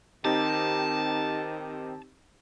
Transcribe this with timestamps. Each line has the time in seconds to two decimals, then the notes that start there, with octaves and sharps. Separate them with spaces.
0.25 D#3 C4 D#4 G4 A5